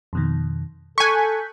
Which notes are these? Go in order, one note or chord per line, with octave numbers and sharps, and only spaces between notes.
F2 B2 D#3
A4 G#5 C#6 F#6 G6 B6